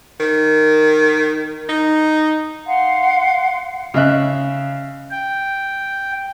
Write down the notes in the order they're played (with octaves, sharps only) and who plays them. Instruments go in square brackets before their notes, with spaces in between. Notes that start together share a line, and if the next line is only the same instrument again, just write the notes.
[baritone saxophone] D#3
D#4
[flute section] F5 F#5 C6
[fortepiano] C#3 D#5 E5 F#6
[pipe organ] G5